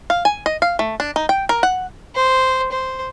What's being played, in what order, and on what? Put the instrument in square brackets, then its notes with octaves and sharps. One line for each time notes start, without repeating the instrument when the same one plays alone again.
[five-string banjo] F5
G#5
D#5
F5
A3
D4
D#4
G5
A#4
F#5
[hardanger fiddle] C5
C5